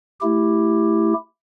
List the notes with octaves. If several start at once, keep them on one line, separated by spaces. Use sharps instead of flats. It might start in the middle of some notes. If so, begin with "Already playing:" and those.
A3 E4 G4